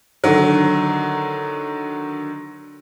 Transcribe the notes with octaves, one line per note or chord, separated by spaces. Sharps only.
D3 D#3 F#3